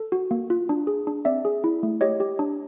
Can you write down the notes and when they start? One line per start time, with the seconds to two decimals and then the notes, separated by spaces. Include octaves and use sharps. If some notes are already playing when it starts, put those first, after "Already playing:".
Already playing: A4
0.12 F#4
0.31 A#3
0.50 F4
0.69 D4
0.87 G#4
1.07 D4
1.25 C4 D5 E5
1.45 G#4
1.64 E4
1.83 A3
2.01 G4 C#5 D#5
2.20 G4
2.39 D4